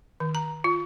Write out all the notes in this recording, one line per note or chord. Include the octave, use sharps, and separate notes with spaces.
D#3
A#5
F4